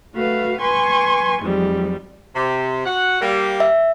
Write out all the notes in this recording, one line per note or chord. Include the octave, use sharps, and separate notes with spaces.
A3 F#4 B4 F5
B4 G#5 C6 C#6
F2 G#2 F#3 G3
C3
F#4 F#5
G3 A#3
E5